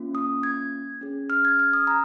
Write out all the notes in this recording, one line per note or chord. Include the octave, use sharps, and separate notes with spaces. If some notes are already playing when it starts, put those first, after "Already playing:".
Already playing: A#3 C#4 F4
D#6
G#6
C#4 G#4
F6
G#6
F6
D#6
A#5